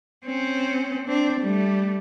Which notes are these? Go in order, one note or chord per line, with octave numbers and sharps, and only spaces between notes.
C4 C#4
C4 D4
G3 A3